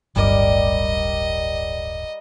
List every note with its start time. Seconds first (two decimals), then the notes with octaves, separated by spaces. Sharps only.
0.16 D1 G1 G2 G3 A#4 D5 D#5